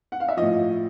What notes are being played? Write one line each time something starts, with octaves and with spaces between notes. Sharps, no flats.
F#5
F5
E5
A2 F3 D#5